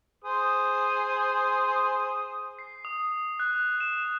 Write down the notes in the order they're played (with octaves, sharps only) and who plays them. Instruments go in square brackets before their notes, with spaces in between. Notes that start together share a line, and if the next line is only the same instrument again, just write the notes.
[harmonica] G#4 C5 D#6
[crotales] C7
D#6
F#6
E7